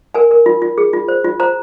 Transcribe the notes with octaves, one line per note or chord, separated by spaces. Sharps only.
A#4 G#5
A#4
F4
F4
G#4
F4
C5
F4
C5 A#5